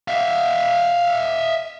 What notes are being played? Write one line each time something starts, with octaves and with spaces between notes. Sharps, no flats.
E5 F5